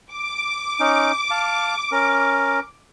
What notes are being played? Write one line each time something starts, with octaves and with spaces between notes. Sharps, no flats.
D6
C#4 D#4
F5 A5
C#4 A#4